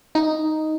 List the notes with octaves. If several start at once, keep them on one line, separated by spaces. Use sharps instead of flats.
D#4